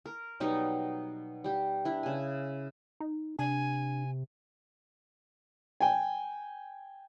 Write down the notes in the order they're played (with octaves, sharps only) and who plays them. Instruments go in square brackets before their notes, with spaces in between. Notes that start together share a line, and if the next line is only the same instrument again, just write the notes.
[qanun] A#4
B2 F#3 G3 D#4
G3 G4
D4 E4
C#3 G#5
[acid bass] D#4
[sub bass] C3 [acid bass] D4 [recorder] G#5
[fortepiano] G5 G#5